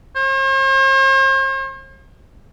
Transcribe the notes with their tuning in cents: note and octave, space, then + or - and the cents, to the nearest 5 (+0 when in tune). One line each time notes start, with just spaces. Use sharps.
C5 +45